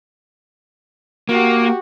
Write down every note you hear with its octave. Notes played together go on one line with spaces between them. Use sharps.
A#3 F#4 G4